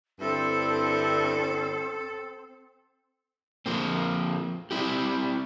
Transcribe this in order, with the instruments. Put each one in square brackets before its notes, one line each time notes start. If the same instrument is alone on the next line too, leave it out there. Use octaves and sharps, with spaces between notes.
[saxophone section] G2 D3 E4 [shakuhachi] C4 [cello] A4
[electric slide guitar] F3 A#3 C4
C4 E4 G4